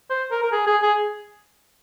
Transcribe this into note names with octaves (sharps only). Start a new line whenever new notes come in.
C5
A#4
A#4
G#4
G#4
G#4